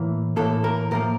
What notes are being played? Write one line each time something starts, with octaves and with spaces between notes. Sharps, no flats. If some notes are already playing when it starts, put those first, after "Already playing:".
Already playing: A2 E3 A#3
A2 E3 A#3 A4
A#4
A2 F3 A#3 A#4